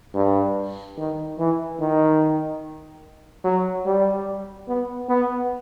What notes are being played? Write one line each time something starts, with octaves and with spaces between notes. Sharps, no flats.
G2
D#3
E3
D#3
F#3
G3
B3
B3